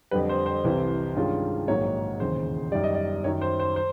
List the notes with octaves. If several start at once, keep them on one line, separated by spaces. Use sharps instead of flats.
F2 D3 G3 B4
C5
C5
C2 C3 E3 G3
G2 D#3 G#3 C#4 F4
A#1 G#2 D#3 F#3 A#3 C#5
E1 D#2 C#3 C5
F#2 D#3 G3 D5
D#5
D5
F#2 D#3 F#3 C#5
C5
C5
C5